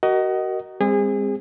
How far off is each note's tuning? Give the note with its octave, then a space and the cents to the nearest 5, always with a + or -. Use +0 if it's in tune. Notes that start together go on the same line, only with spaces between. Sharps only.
F#4 +30 A#4 +0 D#5 +0
G#3 -45 C4 +0 G#4 -30